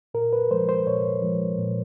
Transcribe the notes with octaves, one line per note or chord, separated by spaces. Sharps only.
A#2 A#4
B4
F3 G#3 C5
C5
A#2 C#5
F3 G#3
A#2